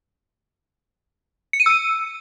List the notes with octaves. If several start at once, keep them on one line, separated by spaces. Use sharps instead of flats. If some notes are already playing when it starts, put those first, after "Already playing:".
C#7
D#7
E6